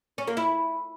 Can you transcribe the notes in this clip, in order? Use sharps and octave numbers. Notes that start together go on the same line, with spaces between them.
C#4
A#3
E4